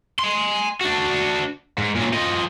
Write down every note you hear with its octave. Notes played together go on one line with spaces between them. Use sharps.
G#5 C6
D4 F#4
G#2
A#2 F#3
F3 D#5